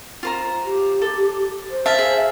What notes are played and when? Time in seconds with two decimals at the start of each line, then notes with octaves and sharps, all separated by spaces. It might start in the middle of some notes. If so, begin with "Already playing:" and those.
0.23 F4 C5 A#5
0.65 G4
1.02 A4
1.70 C5
1.86 E5 F5 A5
1.99 G#4